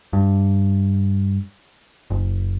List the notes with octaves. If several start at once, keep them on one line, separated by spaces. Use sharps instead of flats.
G2
F#1